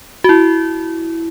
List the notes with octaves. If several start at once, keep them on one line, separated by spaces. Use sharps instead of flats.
F#4
E4